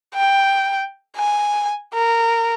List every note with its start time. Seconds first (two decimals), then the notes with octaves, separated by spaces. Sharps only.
0.15 G5
1.17 G#5
1.94 A#4